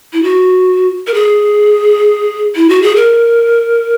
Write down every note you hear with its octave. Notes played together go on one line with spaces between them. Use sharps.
E4
F#4
A#4
G#4
E4
F#4
G#4
A#4